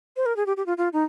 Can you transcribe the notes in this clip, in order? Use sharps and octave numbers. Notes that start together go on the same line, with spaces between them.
C5
A#4
G#4
G4
G4
F4
F4
D#4